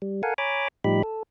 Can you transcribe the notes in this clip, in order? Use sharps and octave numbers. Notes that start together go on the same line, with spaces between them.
G3
A4 A#4 F5 F#5 G#5
C#5 G#5 A#5 B5 D6
A2 F3 G3 D#4 G4 B5
A4